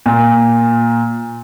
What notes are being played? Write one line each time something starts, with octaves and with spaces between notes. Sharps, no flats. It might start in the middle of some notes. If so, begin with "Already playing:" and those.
A#2